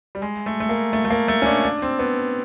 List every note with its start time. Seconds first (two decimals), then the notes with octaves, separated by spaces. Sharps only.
0.15 G3
0.22 G#3
0.46 A3
0.60 A3
0.69 A#3
0.93 A3
1.05 A3
1.11 A#3
1.28 A3
1.42 C#4
1.46 D4
1.64 D4
1.82 C4
1.99 B3